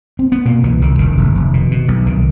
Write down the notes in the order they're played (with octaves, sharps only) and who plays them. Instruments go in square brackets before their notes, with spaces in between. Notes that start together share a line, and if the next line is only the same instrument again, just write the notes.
[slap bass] C4
B3
B2 A#3
C2 E3
C2 D#3
F1 D#3
F1
F1
B2
B2
B1
C2 D#3